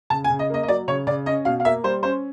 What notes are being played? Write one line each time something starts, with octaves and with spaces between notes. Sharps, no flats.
C#3 A5
G#5
C#3
D#5
A#3 D#5
D#5
F#3 D5
C#3 C#5
C#3 D5
C#4 D#5
B2 F5
F5
A#3 E5
G3 C5
C#4 C5